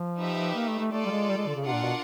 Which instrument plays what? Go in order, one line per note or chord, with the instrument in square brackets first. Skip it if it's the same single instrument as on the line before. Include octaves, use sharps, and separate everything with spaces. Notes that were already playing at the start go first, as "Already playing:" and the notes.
Already playing: [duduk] F3
[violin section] D#4 G4 B4 E5
[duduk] A#3
A3
A3
[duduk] A3 [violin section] F4 A4 D5
[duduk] G3
G#3
G3
G#3
D3
C#3
[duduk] C3 [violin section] D4 F4 A#4 D5 F#5
[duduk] A#2
B2